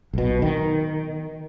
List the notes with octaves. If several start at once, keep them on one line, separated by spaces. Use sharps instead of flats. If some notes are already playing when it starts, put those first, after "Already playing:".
B1 B2
D#3